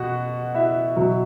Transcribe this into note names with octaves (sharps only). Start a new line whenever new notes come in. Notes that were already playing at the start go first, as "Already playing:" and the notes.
Already playing: B2 F#4 F#5
E4 E5
B2 F#3